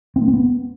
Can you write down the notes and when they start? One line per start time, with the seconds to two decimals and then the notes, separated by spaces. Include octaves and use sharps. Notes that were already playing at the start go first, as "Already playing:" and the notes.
0.16 C4
0.22 A#3
0.28 C4
0.34 B3